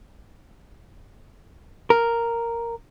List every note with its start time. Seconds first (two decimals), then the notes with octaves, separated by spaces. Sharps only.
1.90 A#4